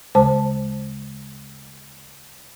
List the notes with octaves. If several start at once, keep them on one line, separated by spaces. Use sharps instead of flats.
D2 C#3 G#3 C5 A5